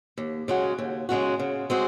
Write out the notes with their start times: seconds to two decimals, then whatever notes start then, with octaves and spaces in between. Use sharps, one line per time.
0.18 D#2
0.48 C#3 G#3 C#4 F#4
0.78 D#2
1.09 C#3 G#3 C#4 F#4
1.39 C#3
1.70 G#3 C4 F#4